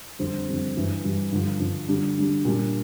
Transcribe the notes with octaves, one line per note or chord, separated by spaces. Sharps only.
F2 D3 G3 C4
F2 D3 G3 C4
G2 E3 G3
G2 E3 G3
G2 D3 F3
G2 D3 F3
D3 G3 D4
D3 G3 D4
A#2 G3 D4